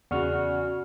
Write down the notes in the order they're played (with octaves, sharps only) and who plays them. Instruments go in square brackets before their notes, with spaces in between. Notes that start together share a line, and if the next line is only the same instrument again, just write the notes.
[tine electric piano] E2 [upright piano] C#3 [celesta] F#4 D5 [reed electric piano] F#5 C#6 F6